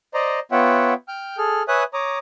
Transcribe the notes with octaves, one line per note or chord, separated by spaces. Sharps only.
C5 D5 D#5 A#5
B3 F4 C#5 E5 F#5 G5
G5 F6 G6
G#4 A4 F6
B4 C#5 E5 G#5 D#6 F#6
C#5 A#5 D6 D#6